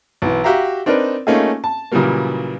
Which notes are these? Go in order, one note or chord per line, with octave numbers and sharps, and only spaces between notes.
B1 E3
F#4 G4 E5 F5 A#5
C4 D4 D#4 A#4 B4
A3 A#3 C#4 D#4 F4 G#4
A5
A#2 C#3 E3 F#3 G3 A#3